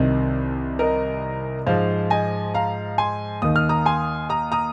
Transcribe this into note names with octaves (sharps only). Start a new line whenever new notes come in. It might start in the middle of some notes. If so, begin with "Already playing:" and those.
Already playing: C2 C3 D#3
A#4 D#5
G#2 F3 C5 F5
D#5 G#5
F5 A#5
G#5 C6
D#2 D#3 D#6
F6
A#5 D#6
G#5 C6
A#5 D#6
A#5 D#6